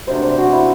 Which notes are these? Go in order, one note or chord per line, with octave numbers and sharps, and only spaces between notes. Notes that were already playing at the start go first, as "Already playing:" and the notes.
C3 F#3 A3 D4 C5
C5
F#4
E4